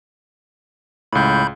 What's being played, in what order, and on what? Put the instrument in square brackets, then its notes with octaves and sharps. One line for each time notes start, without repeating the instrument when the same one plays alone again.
[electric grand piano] C#2 A2 [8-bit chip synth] B5 G6